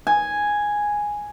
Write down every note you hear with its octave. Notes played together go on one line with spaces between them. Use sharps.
G#5